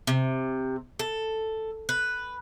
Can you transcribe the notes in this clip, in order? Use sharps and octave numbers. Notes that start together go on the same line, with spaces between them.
C3
A4
B4